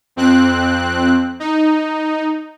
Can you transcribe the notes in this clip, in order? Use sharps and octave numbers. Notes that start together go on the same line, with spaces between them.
F2 C4 F#6
D#4